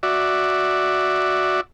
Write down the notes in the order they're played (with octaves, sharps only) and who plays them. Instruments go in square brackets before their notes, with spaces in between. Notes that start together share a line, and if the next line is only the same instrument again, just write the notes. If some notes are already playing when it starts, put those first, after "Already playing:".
[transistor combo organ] F#4 D5 E5